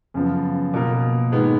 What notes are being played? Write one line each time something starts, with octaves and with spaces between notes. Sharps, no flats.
F#2 C#3 F3 B3
B2 A#3 F4 A#4
G#2 D#3 G#3 B3